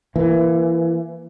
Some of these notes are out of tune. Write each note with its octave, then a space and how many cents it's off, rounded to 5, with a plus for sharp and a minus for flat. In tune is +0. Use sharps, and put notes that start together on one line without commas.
E3 +25 A#3 +15